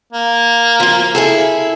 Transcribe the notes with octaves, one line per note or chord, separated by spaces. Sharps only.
A#3
F3 F4
E4 G#4 A4